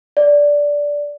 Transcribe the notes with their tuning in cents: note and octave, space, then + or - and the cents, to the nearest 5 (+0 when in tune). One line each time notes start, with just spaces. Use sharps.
D5 -10